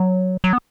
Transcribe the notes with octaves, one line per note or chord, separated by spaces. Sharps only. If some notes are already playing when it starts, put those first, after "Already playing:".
Already playing: F#3
F#3
B3